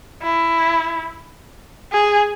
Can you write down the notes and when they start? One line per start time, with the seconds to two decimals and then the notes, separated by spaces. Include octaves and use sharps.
0.22 E4
1.93 G#4